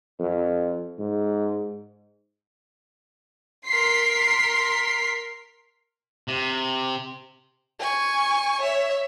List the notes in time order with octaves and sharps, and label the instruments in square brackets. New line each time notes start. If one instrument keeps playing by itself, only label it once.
[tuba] F2
G#2
[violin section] A#4 C6 B6 C7
[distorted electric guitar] C3
[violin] G#5 C#6
C#5 E5